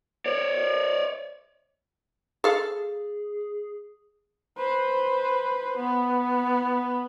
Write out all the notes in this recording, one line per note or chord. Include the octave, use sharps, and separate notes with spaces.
C#5 D5
G#4 A4 F5
B4 C5
B3